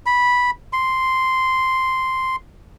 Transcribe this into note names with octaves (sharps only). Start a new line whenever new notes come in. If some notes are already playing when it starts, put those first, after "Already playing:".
B5
C6